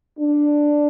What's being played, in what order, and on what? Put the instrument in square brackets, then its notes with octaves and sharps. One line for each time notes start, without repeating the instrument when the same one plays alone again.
[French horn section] D4